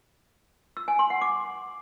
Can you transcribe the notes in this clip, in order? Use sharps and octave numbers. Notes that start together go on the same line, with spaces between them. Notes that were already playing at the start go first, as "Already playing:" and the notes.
E6
G#5
C6
F#5
D6